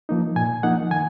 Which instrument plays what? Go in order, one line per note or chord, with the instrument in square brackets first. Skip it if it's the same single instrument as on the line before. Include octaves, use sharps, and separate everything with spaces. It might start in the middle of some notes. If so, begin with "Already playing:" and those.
[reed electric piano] F3 A#3 D#4
A#2 G#5
F3 A#3 D#4 F#5
D#3 G#5